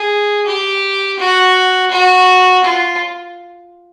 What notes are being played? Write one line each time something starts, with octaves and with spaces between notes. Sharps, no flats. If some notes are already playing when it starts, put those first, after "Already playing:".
Already playing: G#4
G4
F#4
F#4
F4